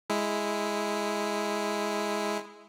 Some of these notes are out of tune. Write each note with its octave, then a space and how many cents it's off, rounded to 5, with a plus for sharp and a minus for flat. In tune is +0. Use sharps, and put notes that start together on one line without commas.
G#3 +0 E4 +0